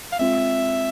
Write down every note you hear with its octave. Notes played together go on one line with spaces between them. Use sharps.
F5
G#3 C4 F4 E5